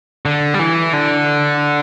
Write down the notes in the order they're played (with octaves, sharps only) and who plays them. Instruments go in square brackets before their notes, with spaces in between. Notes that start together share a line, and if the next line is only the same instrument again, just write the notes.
[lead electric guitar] D3
G3
E3
D3